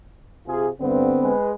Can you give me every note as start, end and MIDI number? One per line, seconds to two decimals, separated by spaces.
0.46 0.69 48
0.46 0.69 65
0.46 0.69 68
0.81 1.10 43
0.81 1.33 50
0.81 1.33 59
0.81 1.33 60
1.21 1.51 56
1.21 1.51 71